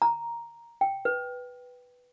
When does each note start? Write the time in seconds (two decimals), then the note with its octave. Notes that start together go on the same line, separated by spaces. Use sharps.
0.02 A#5
0.81 G5
1.05 B4